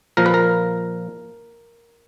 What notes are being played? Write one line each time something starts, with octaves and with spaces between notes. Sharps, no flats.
A#2 F3 A#4
B4
A#4